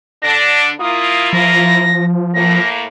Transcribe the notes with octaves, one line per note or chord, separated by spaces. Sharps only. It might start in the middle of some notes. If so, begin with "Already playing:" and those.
D3 D4 A#6
A#3 E4 F4 D#6
F3 A#6
A2 A#3 A#6